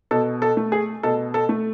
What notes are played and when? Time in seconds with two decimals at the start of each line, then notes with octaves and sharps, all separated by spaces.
0.11 B2 A4
0.42 A4
0.57 A3
0.72 G#4
1.03 B2 A4
1.34 A4
1.49 A3